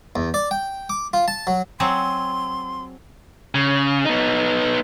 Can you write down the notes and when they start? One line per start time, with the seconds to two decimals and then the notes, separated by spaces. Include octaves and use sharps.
0.16 E2
0.34 D5
0.51 G5
0.89 D6
1.13 F4
1.28 A5
1.47 F#3
1.80 F#3 C4 G#4 C6
3.55 C#3
4.05 B3 D#4